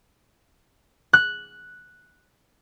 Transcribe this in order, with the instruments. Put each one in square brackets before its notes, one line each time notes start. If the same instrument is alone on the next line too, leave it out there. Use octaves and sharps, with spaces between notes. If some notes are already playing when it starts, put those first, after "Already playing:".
[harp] F#6